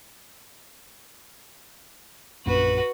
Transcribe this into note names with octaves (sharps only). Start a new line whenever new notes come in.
A#1 F#2 A#3 F#4 B4